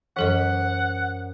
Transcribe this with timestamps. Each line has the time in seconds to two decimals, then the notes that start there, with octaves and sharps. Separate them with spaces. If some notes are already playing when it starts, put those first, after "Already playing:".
0.17 F#2 E3 A4 C5 D#5 F#5